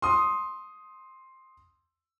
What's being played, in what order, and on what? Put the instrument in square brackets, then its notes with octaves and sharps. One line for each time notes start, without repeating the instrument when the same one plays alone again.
[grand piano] C6 D#6